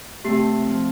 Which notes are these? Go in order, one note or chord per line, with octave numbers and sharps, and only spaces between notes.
C3 A3 G4 C7
F3